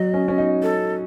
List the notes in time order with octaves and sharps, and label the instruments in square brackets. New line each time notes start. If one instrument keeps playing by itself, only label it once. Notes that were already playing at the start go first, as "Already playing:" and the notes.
Already playing: [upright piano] F#3 [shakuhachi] D#5
[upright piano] C#4
C#4
D#4
[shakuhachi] A4